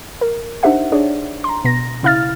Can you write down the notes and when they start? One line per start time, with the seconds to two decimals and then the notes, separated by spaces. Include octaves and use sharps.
0.21 A#4
0.63 D4 D#4 G4 C5 E5 F#5
0.92 D4 G#4 C#5 D5
1.44 A#5 C6
1.65 B2 A#6
2.03 C#3 E4 F5 F6 A6